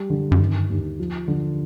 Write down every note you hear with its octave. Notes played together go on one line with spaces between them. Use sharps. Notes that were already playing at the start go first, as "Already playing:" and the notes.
Already playing: G3
D3
F#2
G2 D#3
D#2
F3
D3